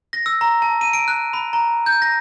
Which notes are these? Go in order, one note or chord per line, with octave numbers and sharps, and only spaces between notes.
A#6
E6
A#5
A5
D#7
D7
F#6
B5
A#5
G6
A#6